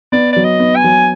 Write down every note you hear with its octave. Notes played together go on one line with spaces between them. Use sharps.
B3 D5
F#3 D5
D#5
B3
G#5
F#3